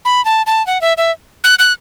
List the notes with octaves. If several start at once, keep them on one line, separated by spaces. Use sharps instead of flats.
B5
A5
A5
F#5
E5
E5
F#6
F#6